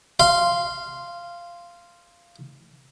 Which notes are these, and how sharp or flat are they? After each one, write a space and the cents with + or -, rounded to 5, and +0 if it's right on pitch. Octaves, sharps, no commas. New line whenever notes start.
F5 -15 C6 +0